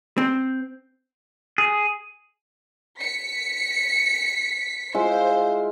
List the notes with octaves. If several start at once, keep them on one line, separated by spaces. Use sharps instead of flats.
C4
G#4
B6 C#7
G#3 E4 F4 C5